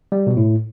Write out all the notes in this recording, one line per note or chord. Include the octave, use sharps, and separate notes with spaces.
G3
B2
A2